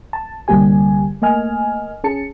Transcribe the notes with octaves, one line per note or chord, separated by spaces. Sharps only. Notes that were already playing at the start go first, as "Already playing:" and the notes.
A5
C2 D3 G3 A#3 G4 G#5
A3 A#3 D#5 G#5 F6
C#4 G#4 A5 C#7